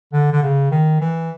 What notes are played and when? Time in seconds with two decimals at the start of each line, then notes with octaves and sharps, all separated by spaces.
0.13 D3
0.33 D3
0.42 C#3
0.71 D#3
1.01 E3